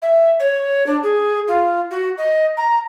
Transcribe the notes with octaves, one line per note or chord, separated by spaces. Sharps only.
E5
C#5
D4
G#4
F4
F#4
D#5
A#5